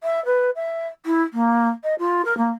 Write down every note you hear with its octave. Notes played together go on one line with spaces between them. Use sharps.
E5
B4
E5
E4
A#3
D#5
F4
A#4
A#3